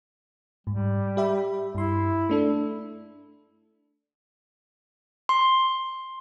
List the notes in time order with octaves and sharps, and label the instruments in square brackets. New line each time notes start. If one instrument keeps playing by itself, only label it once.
[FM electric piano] G#2 [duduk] G3
[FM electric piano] G4 E5 B5
[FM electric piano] G2 C6 [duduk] E4
[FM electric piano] A3 D4 A4
[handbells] C6